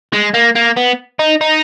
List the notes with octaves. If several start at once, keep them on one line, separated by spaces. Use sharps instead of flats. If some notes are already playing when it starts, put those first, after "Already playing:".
G#3
A#3
A#3
B3
D#4
D#4